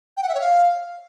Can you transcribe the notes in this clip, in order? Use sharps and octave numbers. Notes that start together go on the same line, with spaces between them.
G5
F#5
E5
C#5
F5